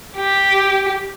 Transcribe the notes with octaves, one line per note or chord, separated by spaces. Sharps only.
G4